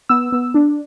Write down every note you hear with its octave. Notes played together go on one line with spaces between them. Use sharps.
B3 E6
B3
D4